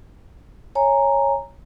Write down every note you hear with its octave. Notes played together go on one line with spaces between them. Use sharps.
C#5 G#5 A#5